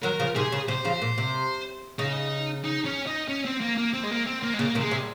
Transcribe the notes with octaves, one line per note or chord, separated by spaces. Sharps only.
D#3 F#3 A#4
C#3 F3
C3 D#3 G#4
C#3
C3 C5
C#3 F3
A#2
C3
C#3 D#4
D#4
C#4
D#4
C#4
C4
A#3
A#3
C4
G#3
A#3
C4
A#3
G#3
C#3 A#3
C3 D#3
G#3
C3